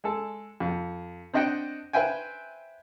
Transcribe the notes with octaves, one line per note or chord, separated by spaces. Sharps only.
G#3 A4
F2
C4 D4 D#5 F#5 G5
B4 C5 E5 G5 G#5